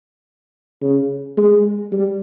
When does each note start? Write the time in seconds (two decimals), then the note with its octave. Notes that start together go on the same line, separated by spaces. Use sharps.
0.82 C#3
1.37 G#3
1.92 G3